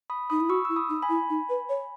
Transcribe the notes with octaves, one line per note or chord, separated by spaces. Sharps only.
B5 D#6
D#4 B5 D#6
E4
F#4 C#6 E6
E4 E6
B5 D#6
D#4
G#5 B5
E4
D#4
B4
C#5